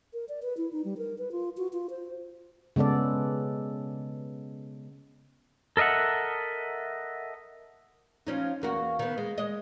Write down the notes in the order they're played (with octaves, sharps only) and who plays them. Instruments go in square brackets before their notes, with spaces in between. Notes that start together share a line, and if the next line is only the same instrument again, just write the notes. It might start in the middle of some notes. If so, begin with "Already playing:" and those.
[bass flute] A#4
D5
B4
E4
D#4
G3
A#4
B4
F4
F#4
F4
C5
[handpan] C#3 G#3 B3 A4 D5
[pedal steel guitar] A4 A#4 D#5 E5 F#5
[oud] F3 C#4 D#4
E2 A#3 F#4
D#3 B3
G#3
G#3 D#5